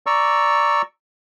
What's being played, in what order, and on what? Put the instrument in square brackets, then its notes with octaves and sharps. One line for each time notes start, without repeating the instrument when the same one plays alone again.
[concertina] D5 A#5 C#6 E6